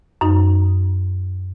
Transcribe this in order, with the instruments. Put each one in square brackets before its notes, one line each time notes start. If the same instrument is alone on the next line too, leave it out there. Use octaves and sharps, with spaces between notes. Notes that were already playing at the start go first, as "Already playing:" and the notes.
[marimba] F#2 D#4